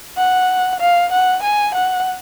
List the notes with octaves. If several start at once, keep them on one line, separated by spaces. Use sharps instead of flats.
F#5
F5
F#5
G#5
F#5